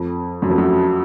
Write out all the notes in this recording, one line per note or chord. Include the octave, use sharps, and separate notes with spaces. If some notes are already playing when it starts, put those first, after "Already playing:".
Already playing: F2
F#2
F2
F#2